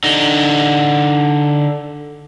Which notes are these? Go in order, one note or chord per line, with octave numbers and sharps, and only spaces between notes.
D3 D#4